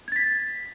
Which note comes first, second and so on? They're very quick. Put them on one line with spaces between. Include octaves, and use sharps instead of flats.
G#6 A6 B6